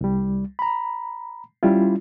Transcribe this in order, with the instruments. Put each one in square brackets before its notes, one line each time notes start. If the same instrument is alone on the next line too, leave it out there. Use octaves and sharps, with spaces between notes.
[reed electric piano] C2 G3
A#5 B5
G3 C#4 E4 F4